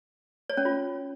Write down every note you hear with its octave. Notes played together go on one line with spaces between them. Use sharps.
C#5
C#4
F4